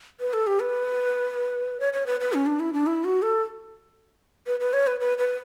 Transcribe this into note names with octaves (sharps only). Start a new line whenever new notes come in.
B4
A4
G4
B4
C#5
C#5
B4
B4
C#4
D4
E4
D4
E4
F#4
A4
B4
B4
C#5
B4
B4
B4